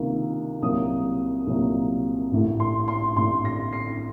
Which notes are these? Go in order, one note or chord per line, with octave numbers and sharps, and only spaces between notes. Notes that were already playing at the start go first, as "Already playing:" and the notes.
Already playing: C#2 C3 D#3 A#3
C2 A#2 F#3 A#3 D#6
C2 A#2 F#3 A#3
A1 A2 A3
C6
C6
A1 A2 A3 C6
A#6
C7